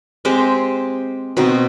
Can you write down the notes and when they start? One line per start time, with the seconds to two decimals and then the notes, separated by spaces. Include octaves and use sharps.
0.25 G#3 C4 G4 C5
1.37 B2 C4 D#4